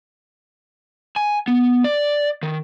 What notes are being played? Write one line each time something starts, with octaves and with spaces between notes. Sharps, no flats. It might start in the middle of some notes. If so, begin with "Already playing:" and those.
G#5
B3
D5
D#3